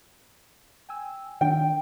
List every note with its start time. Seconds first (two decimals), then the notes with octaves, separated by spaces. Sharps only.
0.89 G5 G#5 E6
1.41 D#3 D4 G5